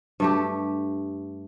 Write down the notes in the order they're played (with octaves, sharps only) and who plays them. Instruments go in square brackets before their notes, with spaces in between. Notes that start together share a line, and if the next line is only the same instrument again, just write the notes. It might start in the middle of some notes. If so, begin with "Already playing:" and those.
[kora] G2 A3 G4